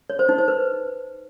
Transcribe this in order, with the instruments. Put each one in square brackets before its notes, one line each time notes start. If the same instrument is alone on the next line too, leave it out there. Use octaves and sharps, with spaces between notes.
[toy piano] C#5
C5
D#4
C5
B4